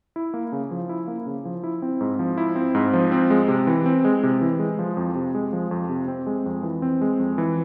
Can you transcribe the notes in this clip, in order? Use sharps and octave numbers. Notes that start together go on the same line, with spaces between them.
E4
A#3
C#3
F3
E4
A#3
C#3
F3
E4
C4
G#2
F3
E4
C4
G#2
F3
C4
G#3
C3
E3
C4
G#3
C3
E3
G#3
F3
F2
C3
G#3
F3
F2
C3
C4
G#3
F2
E3
C4
G#3
F2
E3